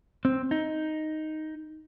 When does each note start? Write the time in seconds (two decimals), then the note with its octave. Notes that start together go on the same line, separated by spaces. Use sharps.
0.25 C4
0.51 D#4